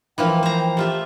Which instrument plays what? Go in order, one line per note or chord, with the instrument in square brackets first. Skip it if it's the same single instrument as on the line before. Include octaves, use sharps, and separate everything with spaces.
[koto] E3 F3 A#3 [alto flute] G5
[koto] C5 A#5
[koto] A3 F4 E5 [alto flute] G4